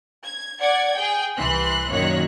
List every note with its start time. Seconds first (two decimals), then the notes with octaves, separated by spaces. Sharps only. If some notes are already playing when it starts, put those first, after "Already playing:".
0.24 G#6
0.60 D5 F#5 G#6
0.95 G#4 G5
1.37 C2 E3 C6 F#6
1.91 F#2 A#2 D#3 C#5 F#6